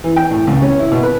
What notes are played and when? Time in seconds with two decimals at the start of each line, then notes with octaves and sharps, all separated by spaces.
0.04 E3
0.16 G5
0.31 A2
0.47 C#2
0.62 C#4
0.79 E4
0.92 B2
1.03 B4